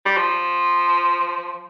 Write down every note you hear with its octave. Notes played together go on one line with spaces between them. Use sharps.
G3
F3